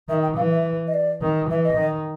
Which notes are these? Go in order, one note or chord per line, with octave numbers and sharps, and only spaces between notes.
D#3 E5
G5
E3 F5
E5
D#5
D5
D#3
E3 E5
D#5
D#3